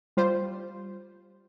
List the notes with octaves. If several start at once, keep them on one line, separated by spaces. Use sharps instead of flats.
G3 F4 C5